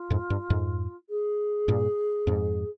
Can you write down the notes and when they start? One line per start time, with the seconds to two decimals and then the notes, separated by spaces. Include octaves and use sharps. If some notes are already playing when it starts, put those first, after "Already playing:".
Already playing: F4
0.10 F2 G#2
0.30 G2
0.50 F2 G#2
1.09 G#4
1.68 G2 A#2
2.27 F2 G#2